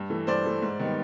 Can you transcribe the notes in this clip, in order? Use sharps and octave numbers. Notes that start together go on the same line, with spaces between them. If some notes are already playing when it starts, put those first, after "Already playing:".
Already playing: G2
E3 A3
G2 C5 D5
E3 A3
G#2
D#3 G3 B3